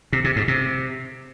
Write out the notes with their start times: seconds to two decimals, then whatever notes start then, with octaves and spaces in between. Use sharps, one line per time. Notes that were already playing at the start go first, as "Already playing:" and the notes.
0.13 C3
0.24 C3
0.36 G#2
0.48 C3